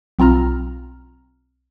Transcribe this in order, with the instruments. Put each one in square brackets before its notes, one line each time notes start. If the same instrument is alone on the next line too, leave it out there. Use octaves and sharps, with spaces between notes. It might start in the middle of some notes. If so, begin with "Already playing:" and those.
[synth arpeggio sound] B1 C4 F4 A#5 F6